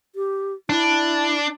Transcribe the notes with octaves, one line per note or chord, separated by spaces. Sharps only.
G4
D4 E4